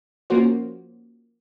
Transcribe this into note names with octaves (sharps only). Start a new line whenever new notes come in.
F3 A#3 C#4 F#4 C5